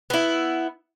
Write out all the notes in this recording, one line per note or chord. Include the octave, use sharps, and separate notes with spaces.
B3 E4